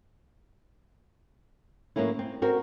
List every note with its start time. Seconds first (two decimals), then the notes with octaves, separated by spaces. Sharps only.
1.96 A2 F#3 A#3 C#4 E4
2.19 C4
2.42 C4 F#4 A#4